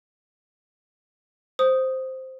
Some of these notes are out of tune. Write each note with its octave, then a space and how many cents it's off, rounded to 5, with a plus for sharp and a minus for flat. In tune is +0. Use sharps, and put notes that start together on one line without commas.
C5 +0 D#6 +0